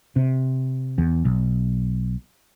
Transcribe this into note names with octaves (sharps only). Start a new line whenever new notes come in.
C3
E2
B1